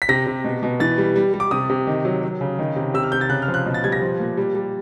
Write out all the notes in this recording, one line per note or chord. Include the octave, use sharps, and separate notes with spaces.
B6
C3 A#6
C3
B2
B2
E3 A6
G3
G3
G3
D6
C3 D#6
C3
D#3
F#3
F#3
C#3
D#3
C3
C3 E6
F6
C3 G6
A6
C#3 F#6
F6
F3
F#6
B2
A6
G3 G#6
A#6
F3
A#2
G3
G3